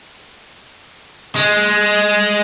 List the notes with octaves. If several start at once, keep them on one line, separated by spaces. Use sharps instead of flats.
G#3